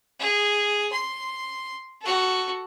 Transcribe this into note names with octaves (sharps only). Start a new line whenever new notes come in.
G#4
C6
F#4 A4